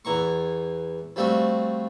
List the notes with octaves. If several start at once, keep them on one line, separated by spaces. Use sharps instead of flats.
E2 E3 A#5 C#6
F3 G3 A3 C4 F#4